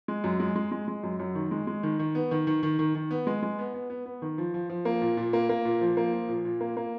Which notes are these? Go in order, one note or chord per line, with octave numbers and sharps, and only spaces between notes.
G#3
F#2
G#3
G#3
G#3
G#3
F#2
F#2
D#3
G#3
G#3
D#3
D#3
B3
D#3
D#3
D#3
D#3
D#3
B3
G#3
G#3
B3
B3
B3
B3
D#3
F3
F3
F3
A#3
A#2
A#2
A#3
A#3
A#2
F3
A#3
F3
A#2
A#2
A#3
A#3